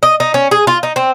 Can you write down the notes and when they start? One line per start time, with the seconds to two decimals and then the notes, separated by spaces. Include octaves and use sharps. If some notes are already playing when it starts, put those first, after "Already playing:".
0.03 D#5
0.20 D#4
0.34 C#4
0.51 G#4
0.67 F4
0.83 D#4
0.96 C4